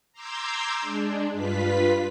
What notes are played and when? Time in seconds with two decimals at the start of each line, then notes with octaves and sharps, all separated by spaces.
0.13 A#5 C6 D6 E6 G6 G#6
0.81 G#3 D4
1.32 G2 F4 B4 B6